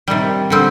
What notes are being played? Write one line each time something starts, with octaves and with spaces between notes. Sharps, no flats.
C3 D#3 G3
D3 G3 C4